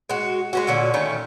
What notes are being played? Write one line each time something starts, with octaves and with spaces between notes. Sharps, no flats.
G#3 F#4
G#3 C#4 F#4
A#2 D3 C#4 D5
D#3 A3 C#4